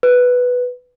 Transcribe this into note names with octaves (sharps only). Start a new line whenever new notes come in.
B4